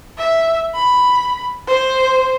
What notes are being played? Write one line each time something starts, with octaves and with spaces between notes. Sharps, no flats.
E5
B5
C5